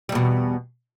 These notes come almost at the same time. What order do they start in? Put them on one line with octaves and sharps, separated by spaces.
G3 E2 B2